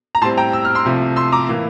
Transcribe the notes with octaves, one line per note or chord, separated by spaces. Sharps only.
A#5
A2 G3 C4 A5 C6
G5 A#5
E6
F6
C6 E6
C2 C3 F3 A3
C6 E6
A#5 D6
A2 E3 A#3